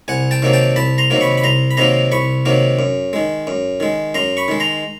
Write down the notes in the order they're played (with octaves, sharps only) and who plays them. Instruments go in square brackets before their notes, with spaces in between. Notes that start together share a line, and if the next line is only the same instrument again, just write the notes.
[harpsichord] C2 F#5 G#5
G5 A5
C3 D#3 F#3 A#3
G5 A5
C2 A5 B5
A#5 C6
C3 D#3 F#3 A#3
B5 C#6
B5
C2 A#5 C6
B5
C3 D#3 F#3 A#3 A#5 C6
C2 B5 C#6
C3 D#3 F#3 A#3
F#2
D#3 G#3
F#2
D#3 G#3
F#2 A#5 C6
B5 C#6
D#3 G#3
A#5 C6